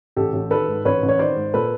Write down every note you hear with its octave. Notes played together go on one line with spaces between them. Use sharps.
A1 G4 A4
A1
D#3 A4 B4
G#2
A1 B4 C#5
A1
C#5
D#3 C5 D5
G#2
A#2 A4 B4